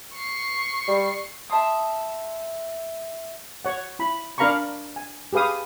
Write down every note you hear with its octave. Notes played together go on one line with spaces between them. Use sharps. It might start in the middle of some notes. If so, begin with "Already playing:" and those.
C#6 C7
G3
E5 A5 C6 D#6
C#5 F#5
E4 B5
D4 A#4 F5 A#5 B5 C#6
G#5
G4 G#4 B4 F5 D#6